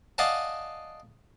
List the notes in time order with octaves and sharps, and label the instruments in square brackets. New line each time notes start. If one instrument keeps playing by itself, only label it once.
[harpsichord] D5 D#5 F5 F#5 G#5 A5